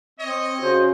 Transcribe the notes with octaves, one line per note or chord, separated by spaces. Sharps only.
C4 C#5 D#5
C#3 F#4 C5